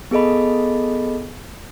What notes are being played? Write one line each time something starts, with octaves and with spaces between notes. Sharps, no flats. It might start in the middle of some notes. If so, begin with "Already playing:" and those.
B3 G#4 A4 D#5 B5